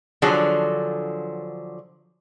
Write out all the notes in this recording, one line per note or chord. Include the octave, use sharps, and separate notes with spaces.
D3 F3 F#3 G#4